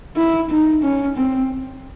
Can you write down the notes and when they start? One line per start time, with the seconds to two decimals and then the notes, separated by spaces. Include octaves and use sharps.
0.17 E4
0.50 D#4
0.83 C#4
1.17 C4